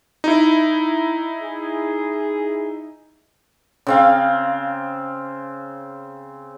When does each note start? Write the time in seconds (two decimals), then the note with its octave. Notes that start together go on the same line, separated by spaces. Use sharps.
0.24 D#4 E4
1.41 G#4
3.87 C#3 C4 F5